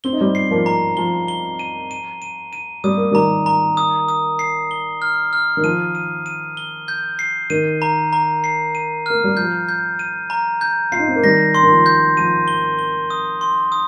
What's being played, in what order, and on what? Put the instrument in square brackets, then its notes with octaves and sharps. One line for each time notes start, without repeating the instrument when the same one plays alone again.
[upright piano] C4 [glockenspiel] G7
[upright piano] D#4
G3 C4
[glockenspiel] C7
[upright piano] F3 A#3
[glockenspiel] A#5
[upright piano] F3 [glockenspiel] G7
[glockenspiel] G7
D#7
D#7
D#7
D#7
[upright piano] G3 [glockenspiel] D#6
[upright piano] A#3
[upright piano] D#3 G3 [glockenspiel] A#5
[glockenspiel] A#5
D#6
D#6
C7
G7
F6
F6
[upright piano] D#3
[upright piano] F3 [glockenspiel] D#7
[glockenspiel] D#7
D#7
G7
G6
C7
[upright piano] D#3 [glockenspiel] D#7
[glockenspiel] A#5
A#5
C7
D#7
[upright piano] A#3 [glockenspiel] F6
[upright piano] G3
[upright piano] F3 [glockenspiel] G6
[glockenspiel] G6
D#7
A#5
G6
[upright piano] F4 [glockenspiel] C7
[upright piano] D#4
C4
A#3
[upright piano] D#3 G3 [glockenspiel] A#6
[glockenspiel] C6
[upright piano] D#3
F3
[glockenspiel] G6
[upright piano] F3 [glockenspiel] D#7
[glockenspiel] G7
G7
D#6
C6
D#6